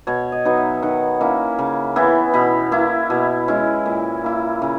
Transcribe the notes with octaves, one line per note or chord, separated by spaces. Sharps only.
B2 C#5
D#5
F#3 B3 D#4
E5
D#3 F#5
A#3 C#4 E4
C#3
E3 B3 E4
B2 B5
A#3 E4
B2
G#3 C#4 E4
A#2
A#3 E4
C#3